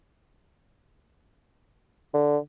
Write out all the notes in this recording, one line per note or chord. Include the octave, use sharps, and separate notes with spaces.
D3